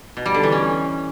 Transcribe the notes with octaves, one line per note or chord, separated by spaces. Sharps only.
B2
G3
D3
E3
C#4